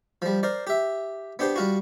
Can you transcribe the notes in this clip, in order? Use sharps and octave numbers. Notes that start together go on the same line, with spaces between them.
F3 G3
A#4 C5 D5
G4 E5
B3 D4 G4 C5
G3 F4 F#4